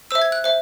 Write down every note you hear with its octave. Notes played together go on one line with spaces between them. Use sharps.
C5 E5 E6
G#6
F#6
C5 E5